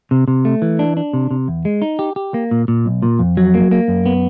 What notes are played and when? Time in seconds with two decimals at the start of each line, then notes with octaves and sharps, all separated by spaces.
0.11 C3
0.28 C3
0.45 A3
0.62 E3
0.79 D4
0.97 D4
1.13 C3
1.31 C3
1.48 E2
1.65 G#3
1.82 D#4
1.99 G4
2.16 G4
2.34 A#3
2.51 A#2
2.68 A#2
2.86 B1
3.02 A#2
3.19 F2
3.37 F#3
3.54 A#3
3.71 A#3
3.88 F#2
4.06 B3